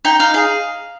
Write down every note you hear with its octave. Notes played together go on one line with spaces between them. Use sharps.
D#4 G5
D#4 F5
G#4 F5